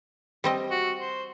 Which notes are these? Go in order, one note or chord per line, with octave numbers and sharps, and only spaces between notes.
G3 C4 D#5
F#4
C5